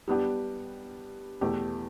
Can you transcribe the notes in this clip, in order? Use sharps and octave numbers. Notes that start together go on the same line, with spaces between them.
G3 B3 D4 G4
E2 B2 A3 G4